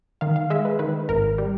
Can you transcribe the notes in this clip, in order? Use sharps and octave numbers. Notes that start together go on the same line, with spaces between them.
D#3 F5
F5
G#3 E5
B4
D#3 B4
G#1 A#4
G3